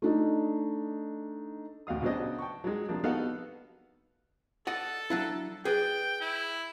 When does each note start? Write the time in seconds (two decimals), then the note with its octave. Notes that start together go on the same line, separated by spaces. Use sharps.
0.02 A3 D4 D#4
1.87 A1 D2 F#4 F5 D#6
2.02 C#3 F#3 B3 D4 C5 D#5
2.39 G5 A5 C#6
2.64 F#3 G#3
2.88 C3 F3 A#3 D4
3.04 B3 D#4 F#4 A4 F5 F#5
4.67 A4 D5 D#5 F#5
5.10 F#3 D4 E4
5.65 G#4 B4 D5 G5
6.21 E4